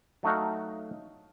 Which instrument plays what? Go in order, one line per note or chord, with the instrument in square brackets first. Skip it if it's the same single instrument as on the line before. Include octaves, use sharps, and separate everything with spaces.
[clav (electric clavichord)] F#3 A3 D#4 F#4 F5